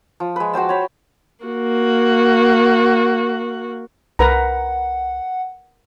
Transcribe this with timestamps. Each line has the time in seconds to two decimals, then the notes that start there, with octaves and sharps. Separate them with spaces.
0.20 F3
0.36 G#3 B4
0.53 F#4 C5 G5 A5
0.69 C#5 B5
1.44 A#3 F#4
4.19 C2 A#4 B4 F#5 A#5